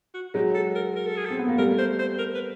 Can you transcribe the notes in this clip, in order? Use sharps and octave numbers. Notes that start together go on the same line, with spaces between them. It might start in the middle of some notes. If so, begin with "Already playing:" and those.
F#4
F#3 G#3 G4
A4
A#4
A#4
A4
G#4
A4
C4
B3
A#3
G3 A3 A#4
C5
C5
A#4
B4